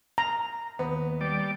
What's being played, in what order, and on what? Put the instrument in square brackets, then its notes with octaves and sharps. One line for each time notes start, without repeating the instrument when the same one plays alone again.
[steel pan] A#5
[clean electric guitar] D#2 [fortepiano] B3
[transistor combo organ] G3 D5